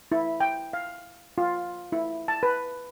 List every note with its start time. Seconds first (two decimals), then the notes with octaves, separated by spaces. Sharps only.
0.12 E4
0.40 G5
0.73 F5
1.38 F4
1.92 E4
2.28 A5
2.43 B4